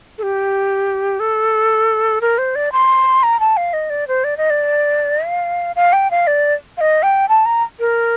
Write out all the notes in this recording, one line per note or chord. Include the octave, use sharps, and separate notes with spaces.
A4
G4
A4
A#4
C5
D5
C6
A#5
A5
F5
D#5
D5
C5
D5
D#5
D5
F5
F5
G5
F5
D5
F5
D#5
G5
A5
A#5
A#4